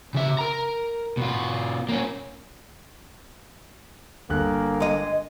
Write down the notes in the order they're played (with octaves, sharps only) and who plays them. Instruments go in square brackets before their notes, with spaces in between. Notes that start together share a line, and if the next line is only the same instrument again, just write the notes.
[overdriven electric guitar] C#3 E5
A#4 A#5
B2 F4
A#3 C#4
[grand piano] G1 F#6 [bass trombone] A#3
[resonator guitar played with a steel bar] G#3 D#5